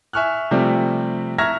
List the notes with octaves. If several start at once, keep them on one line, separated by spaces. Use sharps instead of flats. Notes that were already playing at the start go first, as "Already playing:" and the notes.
E5 G#5 C#6 F6 F#6
C3 F3 G3 A3 C4
E5 A#5 C#6 F6 G#6 A#6